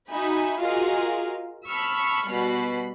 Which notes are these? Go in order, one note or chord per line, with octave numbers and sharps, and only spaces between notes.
D#4 F#4 E5 G#5 B5
F4 F#4 G#4 A#4 D#5 F5
A5 B5 C#6 E6 F6 B6
B2 G3 F#4 B5 C7